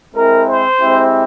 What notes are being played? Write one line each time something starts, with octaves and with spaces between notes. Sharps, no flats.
G#3 C4 E4 A#4
C5
G#3 C4 E4 G4